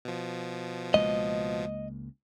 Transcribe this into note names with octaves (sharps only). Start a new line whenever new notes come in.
B2 F3
C#2 G#3 A#3 D#5